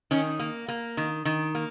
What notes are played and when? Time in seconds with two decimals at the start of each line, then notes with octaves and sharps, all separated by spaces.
0.11 D#3 C#4
0.40 A#3
0.68 A#3
0.97 D#3
1.25 D#3
1.55 A#3